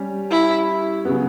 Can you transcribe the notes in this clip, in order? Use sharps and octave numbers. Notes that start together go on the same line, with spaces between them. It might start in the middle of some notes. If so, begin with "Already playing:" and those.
Already playing: G3 C#4 G4
E4
C#3 F#3 B3